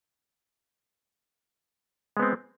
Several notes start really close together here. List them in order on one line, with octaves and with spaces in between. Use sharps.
G#3 B3 C4